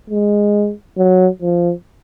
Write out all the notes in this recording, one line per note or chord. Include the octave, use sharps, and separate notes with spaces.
G#3
F#3
F3